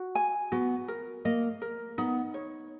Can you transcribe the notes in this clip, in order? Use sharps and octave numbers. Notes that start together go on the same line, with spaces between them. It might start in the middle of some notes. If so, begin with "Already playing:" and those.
Already playing: F#4
G#5
B3 F#4
A#4
A#3 D#5
A#4
B3 D#4
C#5